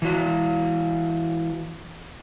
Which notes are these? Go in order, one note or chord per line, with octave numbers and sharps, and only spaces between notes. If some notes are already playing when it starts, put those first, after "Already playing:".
E3 F#4